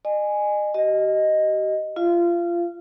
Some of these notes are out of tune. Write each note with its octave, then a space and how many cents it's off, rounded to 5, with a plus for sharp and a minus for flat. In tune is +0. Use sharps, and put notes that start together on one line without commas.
D#5 -35 G#5 +0
G4 -40 D#5 +0
F4 -20 F5 -30